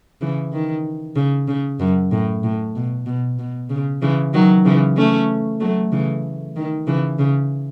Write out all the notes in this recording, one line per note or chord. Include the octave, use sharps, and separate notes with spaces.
C#3 E3
D#3
C#3
C#3
F#2
A2
A2
B2
B2
B2
C#3
C#3 E3
D#3 F#3
C#3 E3
A3 C#4
F#3 A3
C#3 E3
D#3
C#3 E3
C#3